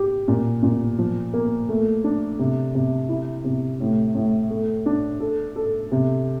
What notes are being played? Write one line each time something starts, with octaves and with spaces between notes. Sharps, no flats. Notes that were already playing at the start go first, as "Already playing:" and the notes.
Already playing: G4
A#2
A#2
F3
A#3
A3
D4
C3
C3
E4
C3
A2
A2
A3
D4
A4
A4
C3